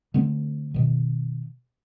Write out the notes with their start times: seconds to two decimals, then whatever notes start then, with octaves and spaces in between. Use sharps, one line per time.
0.14 D3 A3 C4
0.74 B2 D#3